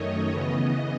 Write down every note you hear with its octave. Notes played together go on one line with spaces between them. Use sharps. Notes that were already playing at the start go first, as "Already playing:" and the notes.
Already playing: F#2 D#3 A3 C#5 D#5
C#3 E3 B3 D#5